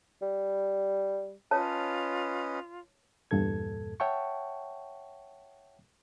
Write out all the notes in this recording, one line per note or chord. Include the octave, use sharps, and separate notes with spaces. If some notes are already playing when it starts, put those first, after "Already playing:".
G3
C#4 F4 B4 C#5 D#5 A5
E2 G2 A#2 A4 G#6
C#5 E5 F#5 G5 A5 C#6